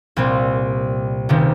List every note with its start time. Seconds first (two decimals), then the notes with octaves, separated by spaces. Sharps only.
0.16 C2 A#2 G3 C4
1.29 C#2 C3 D#3